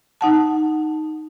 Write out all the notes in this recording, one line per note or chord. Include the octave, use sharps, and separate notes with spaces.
D#4 F#5 A5